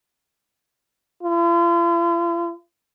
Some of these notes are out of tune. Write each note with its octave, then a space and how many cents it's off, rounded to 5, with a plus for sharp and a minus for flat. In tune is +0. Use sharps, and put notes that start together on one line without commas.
F4 -45